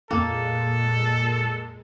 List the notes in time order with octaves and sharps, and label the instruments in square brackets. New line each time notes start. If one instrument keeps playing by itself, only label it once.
[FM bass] F2 [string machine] A#2 G#3 [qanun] A#3 [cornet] A4